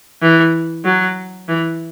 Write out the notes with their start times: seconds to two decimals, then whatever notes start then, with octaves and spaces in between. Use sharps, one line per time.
0.22 E3
0.84 F#3
1.48 E3